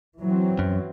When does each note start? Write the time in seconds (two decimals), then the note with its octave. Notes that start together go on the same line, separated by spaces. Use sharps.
0.20 E3 F#3 C4
0.59 F#2